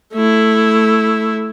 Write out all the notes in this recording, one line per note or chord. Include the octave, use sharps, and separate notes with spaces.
A3 E4